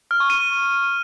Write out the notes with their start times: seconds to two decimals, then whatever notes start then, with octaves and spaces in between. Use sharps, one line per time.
0.11 F6
0.20 C#6
0.30 D#7